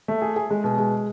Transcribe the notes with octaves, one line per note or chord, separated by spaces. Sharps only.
A3
G#4
G#4
G#3
B2
G#3